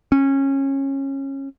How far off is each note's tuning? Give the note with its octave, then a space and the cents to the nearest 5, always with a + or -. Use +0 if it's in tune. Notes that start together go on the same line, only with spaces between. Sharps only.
C#4 -20